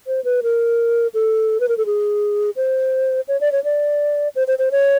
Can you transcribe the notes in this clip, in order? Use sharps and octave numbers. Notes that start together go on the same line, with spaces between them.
C5
B4
A#4
A4
B4
A#4
A4
G#4
C5
C#5
D5
C#5
D5
C5
C5
C5
C#5